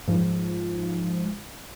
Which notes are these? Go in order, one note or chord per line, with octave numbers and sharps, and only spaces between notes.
G#2 F3